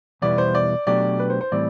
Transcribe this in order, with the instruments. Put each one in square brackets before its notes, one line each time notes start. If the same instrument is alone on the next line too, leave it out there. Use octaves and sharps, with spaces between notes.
[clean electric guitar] E2 B2 G3 B3 E4 [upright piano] D5
[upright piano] C5
D5
[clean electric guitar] B2 F#3 A3 D4 G4 [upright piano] D5
[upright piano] B4
C5
C5
[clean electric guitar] A2 E3 G3 C4 [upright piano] D5